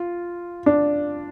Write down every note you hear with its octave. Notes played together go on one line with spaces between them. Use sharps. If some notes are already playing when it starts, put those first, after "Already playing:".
Already playing: F4
D4